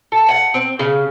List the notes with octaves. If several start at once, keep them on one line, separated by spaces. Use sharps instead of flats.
A4
F#5
C4
C#3